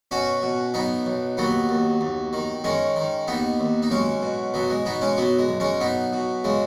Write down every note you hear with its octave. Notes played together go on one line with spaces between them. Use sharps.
B2 C#4 F#4
B2
B1 B3 D#4
B1
D#2 F#3 B3
D#2
D#2
D#3
D#3 G#3 C#4
D#3
D#2 B3 D#4
D#2
D#4
B1 G#3 C#4
B2
B1 F#3 B3
G#3
B2 B3 D#4
G#3 C#4
B1 F#3 B3
G#3
B1
G#3 C#4
B1 B3 D#4
B2
C#3 G#3